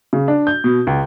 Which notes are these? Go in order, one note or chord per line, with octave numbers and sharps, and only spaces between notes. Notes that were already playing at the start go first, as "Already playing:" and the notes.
C#3
D4
G6
B2
C#2